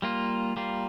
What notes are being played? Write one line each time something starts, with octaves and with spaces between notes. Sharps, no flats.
G3 A#3 F4
G3 A#3 F4